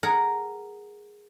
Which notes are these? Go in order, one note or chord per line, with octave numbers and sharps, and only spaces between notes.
G#4 A#4 F#5